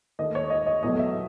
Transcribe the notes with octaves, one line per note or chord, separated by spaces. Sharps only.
D#2 D#3 A3 D#5
C#5
D#5
D#5
E2 B2 F#3 A3 D#5
E5